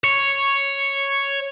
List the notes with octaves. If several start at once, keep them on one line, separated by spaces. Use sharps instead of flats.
C#5